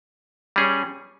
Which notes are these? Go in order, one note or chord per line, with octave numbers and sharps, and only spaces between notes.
G3 C#4 G#4